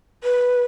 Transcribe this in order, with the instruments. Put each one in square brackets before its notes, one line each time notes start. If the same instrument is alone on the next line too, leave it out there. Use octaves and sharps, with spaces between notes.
[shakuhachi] B4